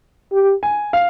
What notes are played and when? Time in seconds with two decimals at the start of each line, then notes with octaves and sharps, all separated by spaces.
0.32 G4
0.63 G#5
0.93 F5